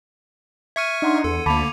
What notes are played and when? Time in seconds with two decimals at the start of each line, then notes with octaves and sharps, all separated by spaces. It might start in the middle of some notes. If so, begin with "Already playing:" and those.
0.76 E5 C#6 F6 G#6 C#7 D#7
1.02 D4 D#4 F#5 C6
1.24 E2 A4
1.46 D2 D3 A#3 A5 B5 D6 F7